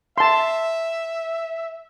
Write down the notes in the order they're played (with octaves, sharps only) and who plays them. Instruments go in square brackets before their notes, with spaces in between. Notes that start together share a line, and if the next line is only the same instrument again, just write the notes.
[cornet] E5 [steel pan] A5 C6